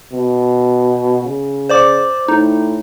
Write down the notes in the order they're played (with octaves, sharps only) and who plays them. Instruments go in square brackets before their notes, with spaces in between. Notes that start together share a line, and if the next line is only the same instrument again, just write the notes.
[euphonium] B2
C#3
[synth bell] C5 D5 D6
[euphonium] A2 [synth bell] D#4